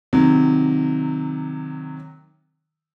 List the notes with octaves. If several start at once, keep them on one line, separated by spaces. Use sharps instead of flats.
C3 D#3 F#3